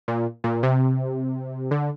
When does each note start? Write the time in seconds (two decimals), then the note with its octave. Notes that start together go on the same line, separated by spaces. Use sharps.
0.08 A#2
0.44 A#2
0.63 C3
1.71 D3